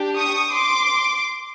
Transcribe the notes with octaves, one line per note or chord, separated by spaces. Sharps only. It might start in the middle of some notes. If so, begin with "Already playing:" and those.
Already playing: D4 G4
C#6 D#6
C6 D6